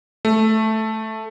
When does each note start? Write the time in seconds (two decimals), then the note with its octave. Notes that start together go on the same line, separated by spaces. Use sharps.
0.25 A3